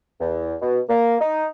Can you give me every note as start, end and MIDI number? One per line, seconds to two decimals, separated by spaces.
0.19 0.55 40
0.61 0.78 47
0.89 1.15 58
1.20 1.47 63